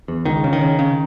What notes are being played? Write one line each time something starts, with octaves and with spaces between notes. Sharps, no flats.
E2
C#2 D#3
C#3
D#3
C#3
C#3